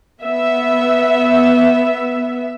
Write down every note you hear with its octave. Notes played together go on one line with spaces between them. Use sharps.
B3 E5